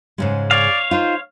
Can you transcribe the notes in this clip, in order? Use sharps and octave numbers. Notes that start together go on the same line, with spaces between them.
G#2 C#3 G#3
C#5 D5 F5
D#4 F4 C5